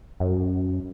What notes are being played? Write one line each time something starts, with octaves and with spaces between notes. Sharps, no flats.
F#2